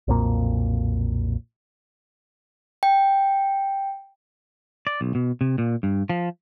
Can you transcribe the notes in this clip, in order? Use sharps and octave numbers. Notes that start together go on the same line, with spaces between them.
B1 F2 A#2 A#3
G5
D5
B1
B2
C3
A#2
G2
F3